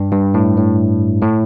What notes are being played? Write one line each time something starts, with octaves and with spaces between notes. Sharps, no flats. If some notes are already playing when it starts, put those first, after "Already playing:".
Already playing: G2
G2
A2
A2
A2